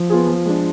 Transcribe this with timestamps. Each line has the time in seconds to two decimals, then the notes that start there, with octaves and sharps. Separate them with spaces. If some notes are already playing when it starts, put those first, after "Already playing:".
Already playing: F3
0.10 B3 F4 G#4
0.27 F3
0.46 G#3 D4